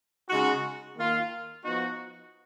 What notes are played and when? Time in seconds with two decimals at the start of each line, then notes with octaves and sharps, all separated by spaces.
0.29 C#3 G#3 D#4 F#4
0.96 D#3 A#3 F4
1.62 F3 B3 D#4 F#4